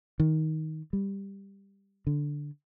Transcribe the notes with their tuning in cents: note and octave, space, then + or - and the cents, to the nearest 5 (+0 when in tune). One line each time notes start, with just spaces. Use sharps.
D#3 +15
G3 +10
D3 -5